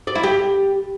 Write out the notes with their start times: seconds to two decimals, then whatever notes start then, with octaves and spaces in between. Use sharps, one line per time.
0.07 D5
0.15 E4
0.23 G4